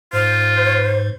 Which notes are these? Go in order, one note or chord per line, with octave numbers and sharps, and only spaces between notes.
G#2 F4 C5